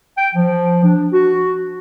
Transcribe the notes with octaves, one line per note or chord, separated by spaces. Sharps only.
G5
F3
D4
F#4